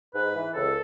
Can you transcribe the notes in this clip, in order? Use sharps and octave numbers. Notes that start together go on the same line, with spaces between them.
G#2 B4
E3
C#2 A4